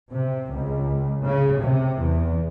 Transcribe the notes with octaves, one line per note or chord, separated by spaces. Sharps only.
C3
C#2
C#3
C3
E2